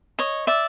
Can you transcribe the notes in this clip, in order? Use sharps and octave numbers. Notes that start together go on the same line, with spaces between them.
C#5 D#5
D5 E5